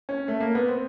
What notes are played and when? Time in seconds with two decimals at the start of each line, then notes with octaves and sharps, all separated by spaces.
0.09 C#4
0.28 A3
0.40 A#3
0.55 B3
0.68 C4